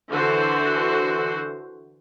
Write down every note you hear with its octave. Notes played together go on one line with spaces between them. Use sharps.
D3 E3 F#4 C5